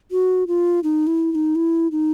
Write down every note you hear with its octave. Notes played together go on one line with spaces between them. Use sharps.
F#4
F4
D#4
E4
E4
D#4
E4
D#4